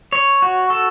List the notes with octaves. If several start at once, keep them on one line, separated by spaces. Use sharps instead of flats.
C#5
F#4
A4